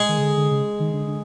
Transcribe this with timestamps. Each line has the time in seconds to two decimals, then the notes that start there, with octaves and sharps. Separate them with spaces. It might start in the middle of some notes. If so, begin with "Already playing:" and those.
Already playing: G#3 G#4
0.09 D#3
0.18 C#3
0.22 D3
0.37 D3
0.51 C#3
0.80 D#3
0.93 D3
1.08 D3